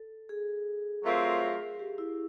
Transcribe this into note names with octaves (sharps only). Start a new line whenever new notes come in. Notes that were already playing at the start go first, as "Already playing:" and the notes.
Already playing: A4
G#4
F#3 A3 C4 F4 A#4
G4
E4